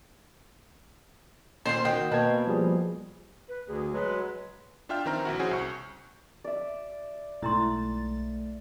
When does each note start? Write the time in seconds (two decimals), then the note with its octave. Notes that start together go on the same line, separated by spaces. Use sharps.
1.66 D#2 A#2 C#4 C5 C6
1.85 D#3 F#3 G5
2.11 B2 A#3 C#4 B4 A5 G#6
2.47 F3 G3 G#4
3.49 B4
3.68 D2 G#4
3.93 F#3 G#3 B4
4.89 D4 F4 E5 G5 F6
5.06 D#3 E3 C4 A#5 F6
5.25 A#1 E4 F#4
5.39 C#4 F#4 G#4 C5
5.51 C2 C#6
6.44 D5 E5
7.42 B1 G#2 A3 E4 A#5 C6 A6